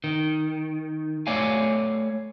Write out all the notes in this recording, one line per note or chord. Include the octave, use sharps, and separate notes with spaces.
D#3
A3 C#5 D5 F5 G#5